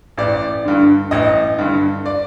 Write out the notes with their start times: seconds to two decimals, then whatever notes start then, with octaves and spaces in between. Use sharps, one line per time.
0.17 A1 D5
0.65 G2 D3
1.11 A1 D#5
1.58 G2 D3
2.06 D5